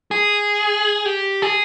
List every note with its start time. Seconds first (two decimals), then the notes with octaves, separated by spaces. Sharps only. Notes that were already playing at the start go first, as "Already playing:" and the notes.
0.11 G#4
1.06 G4
1.42 G#4